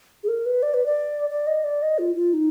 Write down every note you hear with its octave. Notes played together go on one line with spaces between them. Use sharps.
G#4
A#4
B4
D5
B4
D5
D5
D#5
D5
D#5
F4
F4
D#4